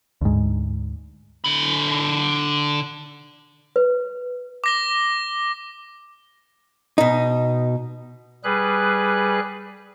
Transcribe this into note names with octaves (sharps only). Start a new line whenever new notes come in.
D2 G#2
D3 B5
B4
D6 A#6 G7
B2 D#4
G3 G#4 B4 F#6